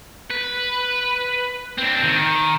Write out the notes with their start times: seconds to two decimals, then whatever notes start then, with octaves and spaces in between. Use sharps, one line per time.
0.30 B4
1.78 C4 D4
2.03 D#3